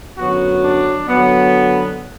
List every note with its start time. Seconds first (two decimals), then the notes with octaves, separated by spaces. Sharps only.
0.17 F#2 D3 F#3 B3 F#4
0.63 D4
1.09 D3 F#3 B3